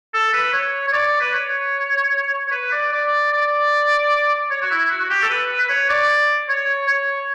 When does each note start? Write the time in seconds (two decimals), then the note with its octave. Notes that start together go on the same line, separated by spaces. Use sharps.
0.14 A4
0.34 B4
0.53 C#5
0.88 C#5
0.93 D5
1.21 B4
1.33 C#5
2.47 C#5
2.52 B4
2.72 D5
2.92 D5
3.32 D5
4.51 C#5
4.62 F#4
4.71 E4
4.90 F#4
5.00 F#4
5.10 G4
5.22 A4
5.30 B4
5.60 B4
5.69 C#5
5.90 D5
6.49 C#5
6.88 C#5